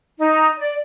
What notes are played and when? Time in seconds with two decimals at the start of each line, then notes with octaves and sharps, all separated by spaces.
0.18 D#4
0.58 D5